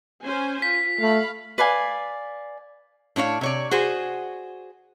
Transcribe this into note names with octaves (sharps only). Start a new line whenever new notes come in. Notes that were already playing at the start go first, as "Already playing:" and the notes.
C#4 C5 G#5
F4 B6
A3 F5 B5
B4 D5 F5 G#5
A2 D4 C#5 F5
C3 C#5 D5
F#4 G#4 C5